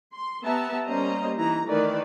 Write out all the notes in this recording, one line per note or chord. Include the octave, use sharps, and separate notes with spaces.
C6
B3 G4 E5 A5 A#5
G3 A#3 C#4 C5 D#5 A#5
E3 D#4 E4 A#5
D#3 E3 A3 B4 D5